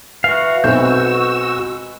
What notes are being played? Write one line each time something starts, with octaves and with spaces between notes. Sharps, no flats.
E3 F#4 F5
B1 G#3 C4 F#4 B4 E6 G6